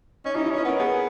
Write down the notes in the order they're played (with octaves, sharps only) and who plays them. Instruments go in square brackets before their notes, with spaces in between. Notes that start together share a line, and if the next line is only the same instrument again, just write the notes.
[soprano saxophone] C#4 [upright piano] D#4
[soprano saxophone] D#4 [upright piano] E4
[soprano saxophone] C#4 [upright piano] E4
[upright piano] B4 D#5
[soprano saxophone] B3 [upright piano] A#4 C#5
[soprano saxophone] B3 [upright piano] G#4 B4